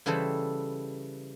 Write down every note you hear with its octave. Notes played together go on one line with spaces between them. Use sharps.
C#3 E3 G3 A4 B4 C5